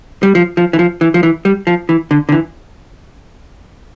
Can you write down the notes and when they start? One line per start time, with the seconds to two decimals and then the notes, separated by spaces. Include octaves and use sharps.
0.23 G3
0.35 F3
0.57 F3
0.73 E3
0.79 F3
1.01 E3
1.14 F3
1.23 E3
1.45 G3
1.67 F3
1.89 E3
2.11 D3
2.29 D3
2.32 E3